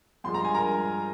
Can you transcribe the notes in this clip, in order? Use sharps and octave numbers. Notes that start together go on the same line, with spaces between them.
G2 F3 G#3 C6
A#5
G#5
A#4 A#5